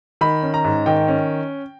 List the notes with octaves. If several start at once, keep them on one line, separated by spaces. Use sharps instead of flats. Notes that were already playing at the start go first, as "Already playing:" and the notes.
D#3 B5
C#4
A#5
G#2
D#3 G5
C#4